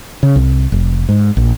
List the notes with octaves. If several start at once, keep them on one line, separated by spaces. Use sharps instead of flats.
C#3
C2
F1
G#2
A#1